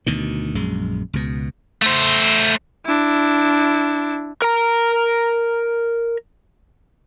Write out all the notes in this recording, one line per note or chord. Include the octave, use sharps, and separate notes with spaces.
D2 B2 D#3
A#1 F#2 G#3
C#2 B2
A3 C5
D4 E4
A#4 A#5